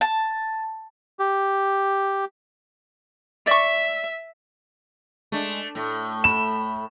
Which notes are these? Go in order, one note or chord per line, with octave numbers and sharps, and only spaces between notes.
A5
G4
D5 E5 C#6
G#3 A3 D4
A2 A3
B5 E7